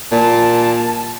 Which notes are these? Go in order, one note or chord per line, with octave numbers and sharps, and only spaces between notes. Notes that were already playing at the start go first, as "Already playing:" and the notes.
A#2 A5